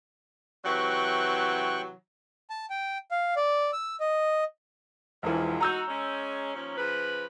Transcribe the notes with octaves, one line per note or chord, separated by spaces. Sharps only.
C3 E3 F#3 G5 C#6 F#6
A5
G5
F5
D5
E6
D#5
E1 E2 G#2 E3 F3
D#4 F#4 A#5 E6 G6
G#3 C#4
D#2 F3 C#4
C#3 F3 B4